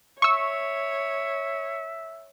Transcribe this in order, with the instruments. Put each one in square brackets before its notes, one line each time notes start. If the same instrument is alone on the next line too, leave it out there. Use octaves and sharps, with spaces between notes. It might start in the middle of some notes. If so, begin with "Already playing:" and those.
[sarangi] C#5 [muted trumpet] E5 [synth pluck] C#6 E6